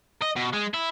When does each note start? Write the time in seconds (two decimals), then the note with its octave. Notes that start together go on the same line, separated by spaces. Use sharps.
0.22 D#5
0.36 B2
0.53 G#3
0.74 E4